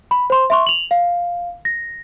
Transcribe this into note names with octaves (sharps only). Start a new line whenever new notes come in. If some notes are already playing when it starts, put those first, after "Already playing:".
B5
C5 C6
E5 C6 C#6
F7 F#7
F5
A#6